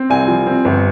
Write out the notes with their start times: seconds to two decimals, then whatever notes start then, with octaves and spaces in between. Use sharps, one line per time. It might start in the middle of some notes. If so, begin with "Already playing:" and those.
Already playing: C4
0.10 C2 G#5
0.28 F3
0.47 C4
0.65 G1